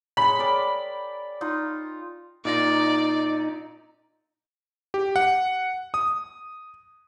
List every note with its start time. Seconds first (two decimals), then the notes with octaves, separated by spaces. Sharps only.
0.17 G#3 C#5 B5
0.39 A#4 D5 G5
1.41 D#4 F4
2.45 A#2 D#4 F4 D5 A#6
4.94 G4
5.16 F#5
5.94 D#6